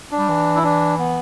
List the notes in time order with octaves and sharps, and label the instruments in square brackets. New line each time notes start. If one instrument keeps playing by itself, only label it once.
[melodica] D4
[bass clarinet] G3
E3
[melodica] E4
D4
B3